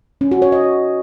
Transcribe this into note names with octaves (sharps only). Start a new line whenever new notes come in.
C#4
F#4
C#5
D#5